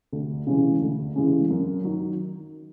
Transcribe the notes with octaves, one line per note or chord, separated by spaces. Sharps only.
D2
C#3 E3 G#3 C#4
D2
C#3 E3 G#3 C#4
F#2
D#3 F#3